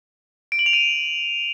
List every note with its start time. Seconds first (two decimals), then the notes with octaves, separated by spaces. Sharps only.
0.52 D7
0.59 F#7
0.66 F7
0.73 D#7